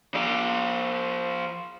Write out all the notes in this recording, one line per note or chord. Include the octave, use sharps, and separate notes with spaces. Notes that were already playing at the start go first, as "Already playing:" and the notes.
F3 D5